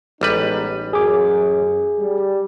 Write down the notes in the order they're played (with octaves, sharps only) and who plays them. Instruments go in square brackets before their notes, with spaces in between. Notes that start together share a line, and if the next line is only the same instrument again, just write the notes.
[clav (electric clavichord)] A1 G3 B4 [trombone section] G#3 B3 D#4
[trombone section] F#2 [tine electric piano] G#4 D6
[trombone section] G3